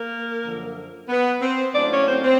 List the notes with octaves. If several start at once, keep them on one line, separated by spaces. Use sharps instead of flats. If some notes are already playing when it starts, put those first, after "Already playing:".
Already playing: A#3 A#4
F#2 D3 F3
B3 B4
C4 C5
A2 F#3 A#3 C#4 D4 D5
C#4 C#5
C4 C5
C4 C5